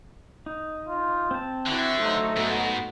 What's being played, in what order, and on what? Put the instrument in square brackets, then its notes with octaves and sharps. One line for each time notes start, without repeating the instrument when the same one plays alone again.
[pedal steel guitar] D#4
[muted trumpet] F4
[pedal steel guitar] C4 A5
[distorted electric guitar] D3 [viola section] E4 F#4 [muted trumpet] E5
[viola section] F#3 A3 D#4 [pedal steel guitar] C5
[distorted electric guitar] G#2 [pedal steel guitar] B3 F#4